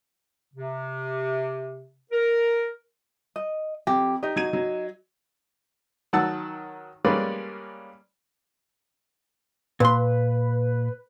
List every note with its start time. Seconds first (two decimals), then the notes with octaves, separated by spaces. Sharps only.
0.54 C3
2.12 A#4
3.36 D#5
3.87 F2 G4
4.23 D#4 G4 D#5
4.36 F#3 G#6 D#7
4.53 F#3
6.13 D#3 F#3 F#5 A5 E6
7.04 G3 G#3 A#3 C#4 B4 D5
9.80 A#2 B4 C6